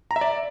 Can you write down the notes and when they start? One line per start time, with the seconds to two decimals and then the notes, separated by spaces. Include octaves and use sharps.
0.11 A#5
0.16 E5
0.21 D5